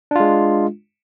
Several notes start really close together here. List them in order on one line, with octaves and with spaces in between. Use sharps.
D4 F4 G#3